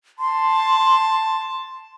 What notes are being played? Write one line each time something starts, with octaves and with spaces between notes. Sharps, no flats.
A5 C6